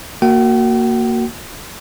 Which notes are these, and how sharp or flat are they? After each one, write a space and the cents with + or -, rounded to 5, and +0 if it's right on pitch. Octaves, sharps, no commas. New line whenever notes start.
A#3 -10 F#4 +0 G5 -45